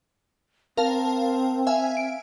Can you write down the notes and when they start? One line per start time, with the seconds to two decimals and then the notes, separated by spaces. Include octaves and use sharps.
0.77 C4 A#4 F5 A5
1.67 E5 F5 G#5
1.97 D7